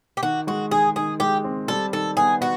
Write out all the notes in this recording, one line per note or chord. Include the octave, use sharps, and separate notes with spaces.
G4
D#3 F#4
G#3 F#4
D#3 G#4
D#3 G#4
G#3 G4
C4
G3 A4
D#3 A4
B3 G#4
B3 F#4